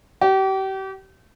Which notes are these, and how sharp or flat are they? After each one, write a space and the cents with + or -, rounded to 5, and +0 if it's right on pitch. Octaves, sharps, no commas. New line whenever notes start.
G4 -35